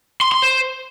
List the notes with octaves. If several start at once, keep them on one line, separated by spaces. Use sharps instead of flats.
C6
C6
C5